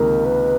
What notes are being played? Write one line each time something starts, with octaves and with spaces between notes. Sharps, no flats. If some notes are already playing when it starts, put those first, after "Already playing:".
Already playing: C#2 C3 D#3 A#3 A#4
B4